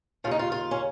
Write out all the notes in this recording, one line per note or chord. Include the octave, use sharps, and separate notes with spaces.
D#2 C#3 F4
D#4
F4
F4
C#4